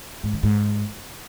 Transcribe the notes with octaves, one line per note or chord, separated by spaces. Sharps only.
G#2
D#3
G#2